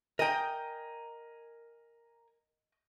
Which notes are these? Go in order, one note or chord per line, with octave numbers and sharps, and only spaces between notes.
A#4 D#5 G5 G#5 A#5